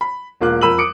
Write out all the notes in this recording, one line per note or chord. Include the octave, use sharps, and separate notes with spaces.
B5
E1 A#3 F4 D6 F#6
F2 A#4 B5 E6 D#7 F#7
D6 D#6 C#7 D7